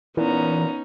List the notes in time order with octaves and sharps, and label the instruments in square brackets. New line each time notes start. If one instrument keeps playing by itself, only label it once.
[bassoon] A#2 [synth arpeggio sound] E3 [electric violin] B3 A#5 [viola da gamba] C#4 D#4